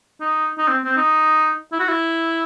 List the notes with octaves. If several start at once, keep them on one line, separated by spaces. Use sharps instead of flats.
D#4
D#4
C4
C4
D#4
E4
F#4
E4